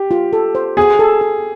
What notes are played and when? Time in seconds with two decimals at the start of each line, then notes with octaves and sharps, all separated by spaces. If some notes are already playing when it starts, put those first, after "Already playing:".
Already playing: G4
0.11 F4
0.33 A4
0.55 C5
0.77 F#4 G#4
0.99 A4
1.21 A4